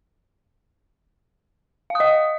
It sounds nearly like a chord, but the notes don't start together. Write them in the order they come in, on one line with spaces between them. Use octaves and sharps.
F5 D#6 D#5